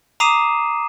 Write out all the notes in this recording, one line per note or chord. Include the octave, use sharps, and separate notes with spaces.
A#5 D6 D#6 C7 D#7 E7